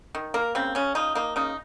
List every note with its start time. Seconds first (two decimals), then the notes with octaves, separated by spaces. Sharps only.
0.15 D#3
0.34 A#3 A#4
0.55 C#3 C4
0.75 C#3 C#4
0.95 F3 D#4
1.15 A#3 D#4
1.36 C#3 D#4